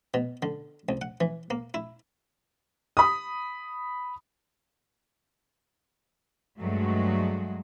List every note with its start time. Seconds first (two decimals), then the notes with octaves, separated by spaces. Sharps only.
0.14 B2
0.43 D3
0.89 C2
1.02 F#5
1.21 E3
1.50 A#3
1.74 E4
2.97 B5 D#6
6.59 G2 F#3 G#3 A3 F#4